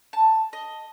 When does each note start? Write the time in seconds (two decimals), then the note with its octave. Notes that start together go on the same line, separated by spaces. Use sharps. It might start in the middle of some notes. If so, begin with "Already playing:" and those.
0.13 A5
0.53 D#5